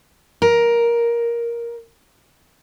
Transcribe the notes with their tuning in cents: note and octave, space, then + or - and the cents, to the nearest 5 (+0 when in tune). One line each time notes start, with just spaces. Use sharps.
A#4 +10